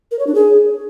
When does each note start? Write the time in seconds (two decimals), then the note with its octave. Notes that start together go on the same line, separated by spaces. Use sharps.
0.11 A#4
0.19 C#5
0.27 D4
0.35 G#4